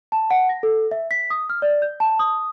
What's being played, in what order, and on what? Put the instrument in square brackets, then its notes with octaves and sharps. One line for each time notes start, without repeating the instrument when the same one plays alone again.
[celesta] A5
F#5
A#6
A4
E5
B6
D#6
F6
D5
G6
A5
D#6